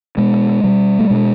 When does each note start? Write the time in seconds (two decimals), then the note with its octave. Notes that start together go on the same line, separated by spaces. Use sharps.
0.17 B2 G#3
0.64 B2 G3
0.99 A3
1.10 B2 G#3